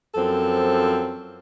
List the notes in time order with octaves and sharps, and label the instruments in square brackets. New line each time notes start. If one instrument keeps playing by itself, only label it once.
[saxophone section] F#2 F3 C4 A4